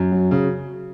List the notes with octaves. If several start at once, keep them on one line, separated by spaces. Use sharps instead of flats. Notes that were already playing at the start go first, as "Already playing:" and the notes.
Already playing: F#2
F#3
C#3